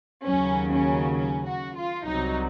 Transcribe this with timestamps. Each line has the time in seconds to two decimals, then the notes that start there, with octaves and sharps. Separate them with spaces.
0.25 D#2 C#3 F#3 C#4
0.71 C#4
1.15 C#4
1.46 F#4
1.76 F4
2.06 C2 C3 F#3 D#4